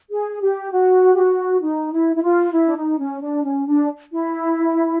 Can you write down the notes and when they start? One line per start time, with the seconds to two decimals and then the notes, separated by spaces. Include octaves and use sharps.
0.11 G#4
0.42 G4
0.72 F#4
1.13 G4
1.16 F#4
1.62 D#4
1.93 E4
2.15 E4
2.23 F4
2.53 E4
2.66 D4
2.76 D#4
2.98 C#4
3.21 D4
3.44 C#4
3.67 D4
4.12 E4